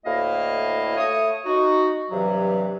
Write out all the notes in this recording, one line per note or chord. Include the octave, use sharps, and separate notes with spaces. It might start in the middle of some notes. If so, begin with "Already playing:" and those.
D2 A2 A#3 E4 D#5 F5
A3 C#5 D#6
D#4 F#4
G2 C3 E3 F#3